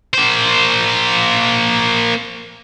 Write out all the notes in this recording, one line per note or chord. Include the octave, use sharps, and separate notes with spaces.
A#3 C5